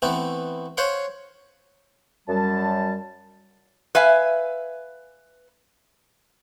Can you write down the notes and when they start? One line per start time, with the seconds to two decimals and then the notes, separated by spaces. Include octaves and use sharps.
0.02 E3 A3 B3 C4
0.77 C5 C#5 F5 F#5 C6
2.29 F#2 G3 A5
3.95 B4 E5 F5 G#5